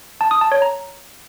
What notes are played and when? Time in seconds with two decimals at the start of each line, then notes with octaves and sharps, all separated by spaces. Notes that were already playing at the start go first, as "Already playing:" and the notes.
0.21 A5
0.31 D#6
0.41 A5
0.52 C#5
0.62 A#5